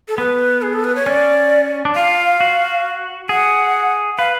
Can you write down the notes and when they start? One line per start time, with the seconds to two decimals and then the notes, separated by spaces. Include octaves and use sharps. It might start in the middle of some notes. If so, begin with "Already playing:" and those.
0.08 A4
0.18 B3 B4
0.62 G#4
0.73 A4
0.84 B4
0.95 C#5
1.06 C#4 D5
1.85 D4
1.96 F4 F5
2.40 F#4
3.29 G#4 F#5
4.18 B4 F5